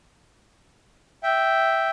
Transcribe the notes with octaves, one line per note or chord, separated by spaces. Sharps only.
E5 G5